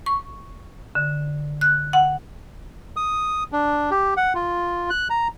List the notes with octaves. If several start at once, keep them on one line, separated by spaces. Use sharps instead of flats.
C#6
D3
F#6
F#5
D#6
D4
G4
F#5
F4
F#6
A#5